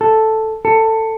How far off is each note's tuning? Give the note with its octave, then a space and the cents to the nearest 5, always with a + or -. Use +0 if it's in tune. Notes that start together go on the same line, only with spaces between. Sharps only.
A4 +0
A4 +15